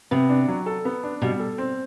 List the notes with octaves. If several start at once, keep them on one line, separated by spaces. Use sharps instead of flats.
C3 B3
D4
F#3
A4
B3
D4
B2 G3
A4
C4